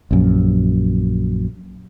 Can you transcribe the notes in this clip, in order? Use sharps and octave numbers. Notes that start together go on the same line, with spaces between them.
A#1 F#2